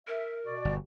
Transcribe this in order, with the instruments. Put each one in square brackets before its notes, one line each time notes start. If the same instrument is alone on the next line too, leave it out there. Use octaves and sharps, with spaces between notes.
[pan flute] A#4 [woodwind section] E5
[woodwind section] B2 F#4 D5
[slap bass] G1